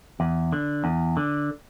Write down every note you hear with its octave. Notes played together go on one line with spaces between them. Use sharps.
E2
D3
E2
D3